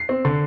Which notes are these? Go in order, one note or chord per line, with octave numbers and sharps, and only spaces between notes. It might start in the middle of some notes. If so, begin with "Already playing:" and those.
Already playing: C7
C4
D3